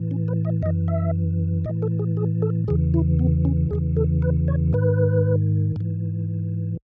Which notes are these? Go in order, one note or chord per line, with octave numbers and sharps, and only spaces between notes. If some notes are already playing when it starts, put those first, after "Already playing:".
Already playing: A2 E3
C#4
B4
D#5
F#2 E3 D#5
E5
A2 E3 D#5
A4
G#4
G#4
A4
E2 C#3 E3 G#4
E4
B3
C#4
E2 C#3 E3 G#4
A4
B4
C#5
G#2 D#3 B4
G#2 E3